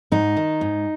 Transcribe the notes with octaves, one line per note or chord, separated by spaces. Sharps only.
G#2 D#4
D#3
G#2